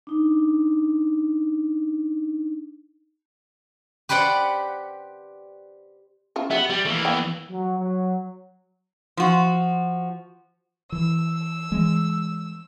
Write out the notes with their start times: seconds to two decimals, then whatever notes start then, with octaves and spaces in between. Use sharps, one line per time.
0.07 D4 D#4
4.09 G4 B4 C5 D5 F#5
6.36 C#4 E4 F4
6.51 B3 G4 A#4 E5
6.70 G3 G4
6.85 E3 A3 A#3
7.05 B3 F5 G5
7.50 F#3
7.79 F#3
9.17 F3 F#4
10.92 E3 E6
11.72 E3 G#3